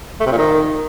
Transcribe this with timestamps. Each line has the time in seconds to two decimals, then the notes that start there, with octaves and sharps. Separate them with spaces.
0.20 A3
0.26 C3
0.32 A#2
0.38 D#3